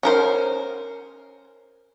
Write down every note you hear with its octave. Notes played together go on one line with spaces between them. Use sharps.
C#4 A#4 C5